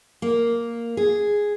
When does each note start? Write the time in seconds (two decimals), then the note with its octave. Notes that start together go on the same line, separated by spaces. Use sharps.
0.22 A#3
0.97 G#4